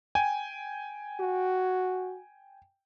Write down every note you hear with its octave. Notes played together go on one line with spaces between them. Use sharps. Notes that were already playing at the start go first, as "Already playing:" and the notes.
G5 G#5
F#4